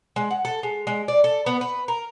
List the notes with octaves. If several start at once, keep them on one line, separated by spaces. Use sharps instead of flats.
G#3
F#5
A4
G#3
G#3
D5
A4
B3
B4
A#4